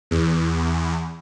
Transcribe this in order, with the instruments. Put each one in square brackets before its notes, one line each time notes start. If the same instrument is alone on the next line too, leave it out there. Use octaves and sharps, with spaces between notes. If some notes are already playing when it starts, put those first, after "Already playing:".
[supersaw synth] E2